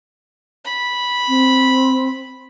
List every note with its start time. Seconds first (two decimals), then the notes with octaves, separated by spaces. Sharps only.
0.65 B5
1.28 C4